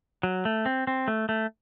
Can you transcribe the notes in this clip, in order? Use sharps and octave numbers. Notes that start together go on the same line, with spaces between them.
F#3
A3
C4
C4
A3
A3